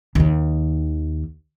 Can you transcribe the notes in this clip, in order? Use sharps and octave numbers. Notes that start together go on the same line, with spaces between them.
D#2 D#3